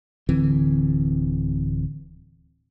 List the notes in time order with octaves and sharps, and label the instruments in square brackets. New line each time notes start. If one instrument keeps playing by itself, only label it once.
[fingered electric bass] D1 D3 E3 C4